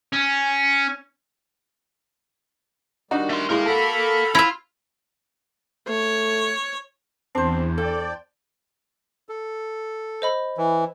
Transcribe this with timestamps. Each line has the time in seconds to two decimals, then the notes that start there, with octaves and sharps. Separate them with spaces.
0.13 C#4
3.11 D#3 G3 D4 D#4 F#4
3.30 A3 C6
3.50 A2 G#3 A#4 F5 C6
3.66 F#4 A4 A5 B5
4.35 E4 F4 E5
5.89 A3 C#5
7.35 E2 C4 D4 C5
7.78 A4 D5 G5
9.29 A4
10.22 C5 D#5 B5
10.57 E3